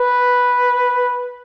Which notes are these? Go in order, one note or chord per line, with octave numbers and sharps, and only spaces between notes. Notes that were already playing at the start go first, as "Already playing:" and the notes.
Already playing: B4